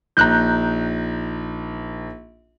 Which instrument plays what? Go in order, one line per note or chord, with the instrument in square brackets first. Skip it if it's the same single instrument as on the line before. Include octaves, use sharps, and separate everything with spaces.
[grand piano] A#1 D#4 [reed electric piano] A#5 F#6 G6